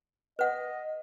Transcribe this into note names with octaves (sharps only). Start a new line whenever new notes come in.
B4 D#5 F#5